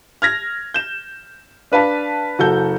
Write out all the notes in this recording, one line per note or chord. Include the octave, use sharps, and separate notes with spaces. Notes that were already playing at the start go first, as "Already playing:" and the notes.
F6 G#6 A#6
G6 E7
D4 B4 F5 A5
F#1 F#4 A4 G6